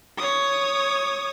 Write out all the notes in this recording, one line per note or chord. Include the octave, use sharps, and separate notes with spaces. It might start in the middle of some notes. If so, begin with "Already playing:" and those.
C#5 D#6